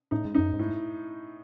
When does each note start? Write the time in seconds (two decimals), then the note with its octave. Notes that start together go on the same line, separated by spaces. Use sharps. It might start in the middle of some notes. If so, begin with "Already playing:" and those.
0.11 A2 D#4
0.25 G#2
0.35 F#2 D#4
0.53 G#2
0.59 A2